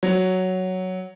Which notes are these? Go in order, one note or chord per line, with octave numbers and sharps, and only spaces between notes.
F#3